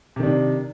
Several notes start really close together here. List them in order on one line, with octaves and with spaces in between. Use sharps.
C3 D#3 D4